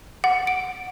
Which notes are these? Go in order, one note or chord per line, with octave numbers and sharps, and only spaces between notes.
F#5
D7